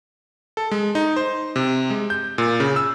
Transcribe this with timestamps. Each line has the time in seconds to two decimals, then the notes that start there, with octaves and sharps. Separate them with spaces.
0.57 A4
0.71 G#3
0.95 D#4
1.16 C5
1.56 C3
1.90 G#3
2.10 G6
2.38 A#2
2.60 C#3
2.76 E6